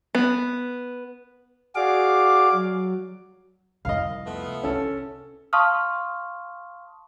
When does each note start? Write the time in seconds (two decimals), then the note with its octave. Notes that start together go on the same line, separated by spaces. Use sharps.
0.15 B3
1.75 F#4 G#4 D5 F5 D6
2.52 F#3
3.85 C2 F2 D#5 F5
4.26 A3 B3 F4
4.63 C2 C#4 A4
5.53 F5 A5 C6 C#6 D#6 F6